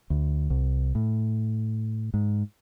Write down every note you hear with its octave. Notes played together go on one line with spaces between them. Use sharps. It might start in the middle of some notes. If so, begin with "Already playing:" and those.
D2
C2
A2
G#2